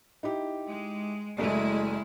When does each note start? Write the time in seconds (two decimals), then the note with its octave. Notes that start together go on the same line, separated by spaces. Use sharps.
0.23 D#4 E4 G4
0.68 G#3
1.38 F#1 G#3 A3 E4 D5